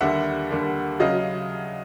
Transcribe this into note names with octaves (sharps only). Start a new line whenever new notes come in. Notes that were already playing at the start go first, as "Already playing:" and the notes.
D#2 D3 G3 A#3 E5 F#5
D#2 D3 G3 A#3
C#3 F#3 D#5 F5